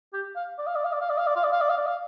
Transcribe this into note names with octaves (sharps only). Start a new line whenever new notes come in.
G4
F5
D5
F5
D5
F5
D5
F5
D5
F5
D5
F5
D5
F5
D5
F5
D5
F5